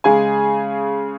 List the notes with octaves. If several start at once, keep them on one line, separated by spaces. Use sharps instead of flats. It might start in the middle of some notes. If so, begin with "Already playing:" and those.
C#3 G#3 G#4 G#5